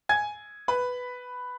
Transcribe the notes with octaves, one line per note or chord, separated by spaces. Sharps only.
G#5 G#6
B4 B5